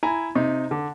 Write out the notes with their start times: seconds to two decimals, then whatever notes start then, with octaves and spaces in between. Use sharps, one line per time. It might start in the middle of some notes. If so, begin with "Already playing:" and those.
0.03 E4 G#5 A#5
0.35 C3 D#4
0.71 D3